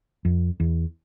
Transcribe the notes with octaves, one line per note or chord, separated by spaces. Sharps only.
F2
E2